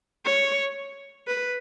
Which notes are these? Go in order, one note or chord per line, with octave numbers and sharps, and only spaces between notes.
C#5
B4